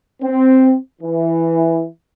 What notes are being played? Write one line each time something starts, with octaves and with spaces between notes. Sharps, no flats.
C4
E3